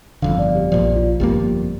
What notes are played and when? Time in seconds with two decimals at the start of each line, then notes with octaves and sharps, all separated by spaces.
0.22 G1 F2 D3 F5
0.39 D5
0.55 G4
0.72 A#1 A#2 F3 D5
0.96 F4
1.20 G1 F2 D3 A#3 G4